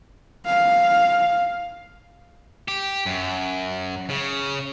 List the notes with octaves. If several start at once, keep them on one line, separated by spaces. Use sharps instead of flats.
F5
G4
F#2
C#3